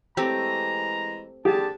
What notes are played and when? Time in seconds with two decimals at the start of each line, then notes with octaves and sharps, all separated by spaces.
0.17 E3 G#3 A3 C4 G4 A#5
1.45 D3 G4 G#4 A5